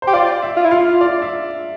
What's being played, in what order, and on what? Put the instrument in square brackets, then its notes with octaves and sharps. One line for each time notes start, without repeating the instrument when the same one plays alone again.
[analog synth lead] G4 [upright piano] C5
[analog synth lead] F4 [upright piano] D5
[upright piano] E5
[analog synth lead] F4
E4
[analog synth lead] F4 [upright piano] F5
[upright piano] D5
E5